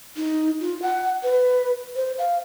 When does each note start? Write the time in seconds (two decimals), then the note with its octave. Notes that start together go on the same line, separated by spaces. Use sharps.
0.17 D#4
0.61 F4
0.82 F#5
1.24 B4
1.96 C5
2.19 F5